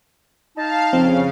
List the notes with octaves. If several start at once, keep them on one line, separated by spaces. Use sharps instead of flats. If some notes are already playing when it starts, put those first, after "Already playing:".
D#4 F5 A5
F2 C#3 C4